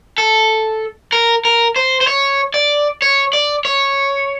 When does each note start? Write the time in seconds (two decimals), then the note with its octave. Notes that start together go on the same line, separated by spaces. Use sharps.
0.18 A4
1.12 A#4
1.45 A#4
1.76 C5
2.01 C5
2.07 C#5
2.54 D5
3.02 C#5
3.33 D5
3.65 C#5